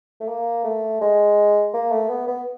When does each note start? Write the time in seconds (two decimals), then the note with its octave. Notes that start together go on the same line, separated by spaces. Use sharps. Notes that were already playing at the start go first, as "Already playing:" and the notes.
0.21 A3
0.28 A#3
0.64 A3
1.01 G#3
1.74 A#3
1.92 A3
2.10 B3
2.28 B3